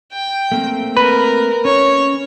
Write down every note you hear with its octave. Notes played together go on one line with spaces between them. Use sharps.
G5
A3 A#3 C4
A#4 B4
C#4 C#5